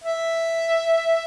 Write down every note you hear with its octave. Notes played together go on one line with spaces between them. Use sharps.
E5